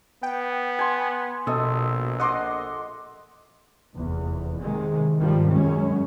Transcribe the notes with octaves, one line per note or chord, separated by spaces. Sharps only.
B3 G5
G#5 C6
A#1 B2 A4 D#5 E5
D#5 F#5 C6 D6
F1 E2
C3 D#3 G#3
G#2 D#3 F3 G3
F#2 G#3 C#4